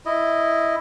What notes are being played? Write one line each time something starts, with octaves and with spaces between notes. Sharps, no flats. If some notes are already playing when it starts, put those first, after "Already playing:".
E4 D#5